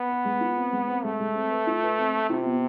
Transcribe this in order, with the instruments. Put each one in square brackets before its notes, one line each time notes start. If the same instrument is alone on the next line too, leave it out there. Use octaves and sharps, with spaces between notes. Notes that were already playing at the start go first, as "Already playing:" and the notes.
Already playing: [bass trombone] B3
[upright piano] B4
G#3
F4
C4
G#3
C4
[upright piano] G#3 [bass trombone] A3
[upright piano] G#3
C4
B4
F4
B4
C4
C4
[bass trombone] C3 [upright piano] F4
[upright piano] B3